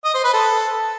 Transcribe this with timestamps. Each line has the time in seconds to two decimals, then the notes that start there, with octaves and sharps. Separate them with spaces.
0.04 D#5
0.14 C5
0.24 B4
0.33 A4